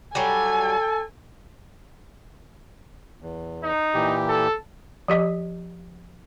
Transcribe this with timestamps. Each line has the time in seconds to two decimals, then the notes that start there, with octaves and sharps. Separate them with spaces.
0.15 F#3 G3 A4 G#5
3.22 E2
3.63 D#4
3.94 A#2 E3 G4
4.28 A4
5.08 F3 G4 D#5